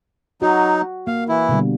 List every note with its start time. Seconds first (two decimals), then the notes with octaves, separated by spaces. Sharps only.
0.42 F#3 D#4 F#4
1.07 A#3 F5
1.29 E3 E4
1.49 B2 D3 G3